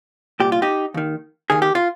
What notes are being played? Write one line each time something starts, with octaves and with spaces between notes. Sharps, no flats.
C2 A#2 G4
F4
D#4 G4
D#2 D#3
D#2 D#3 G#4
G4
F4